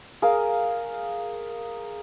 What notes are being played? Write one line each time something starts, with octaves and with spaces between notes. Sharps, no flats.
G#4 A#4 F5